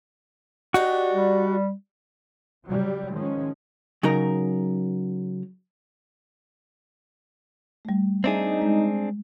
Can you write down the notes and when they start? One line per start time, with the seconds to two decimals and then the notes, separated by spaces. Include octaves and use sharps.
0.74 D4 D#4 F#4 G4
1.12 G3
2.66 C#3 F#3 G3
3.12 D#3 F3 G#3 C#4
4.03 C#3 F#3 D#4 A#4 A#5
7.85 G3 A3
8.24 C4 D4 D#4 G#4 E5
8.62 G#3